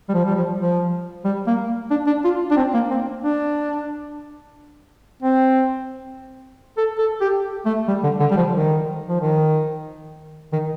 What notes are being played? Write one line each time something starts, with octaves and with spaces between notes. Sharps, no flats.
G3
F3
G3
F3
F3
G3
A#3
D4
D4
F4
D4
C4
A#3
C4
D4
C4
A4
A4
G4
A3
G3
D3
D3
G3
F3
D#3
F3
D#3
D#3